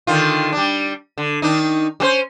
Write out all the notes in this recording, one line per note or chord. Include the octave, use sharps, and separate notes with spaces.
D3 D#3 F4
G3 D4
D3
D#3 D4 D#4
G3 C#4 C5